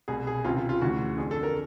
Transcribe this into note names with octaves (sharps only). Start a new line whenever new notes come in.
C2 B2 G#4
G#4
C#2 C3 D#3 F4
F4
F4
D2 C#3 E3 F#4
F2 D3 G#4
A4
A#4